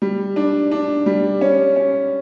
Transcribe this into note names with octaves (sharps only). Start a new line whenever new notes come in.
G3
D4
D4
G3
C#4
C#4